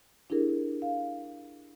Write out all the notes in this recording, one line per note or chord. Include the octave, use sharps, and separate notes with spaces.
D4 E4 G4 G#4 A#4
F5